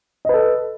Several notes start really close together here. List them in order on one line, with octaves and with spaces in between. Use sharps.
D#5 B4 A4